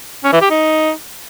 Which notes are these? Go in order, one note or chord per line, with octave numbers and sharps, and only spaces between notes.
C#4
E3
G4
D#4